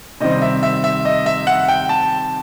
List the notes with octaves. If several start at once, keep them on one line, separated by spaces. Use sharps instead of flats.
C3 D#3 G3 C4 D#5
E5
E5
E5
D#5
E5
F#5
G5
A5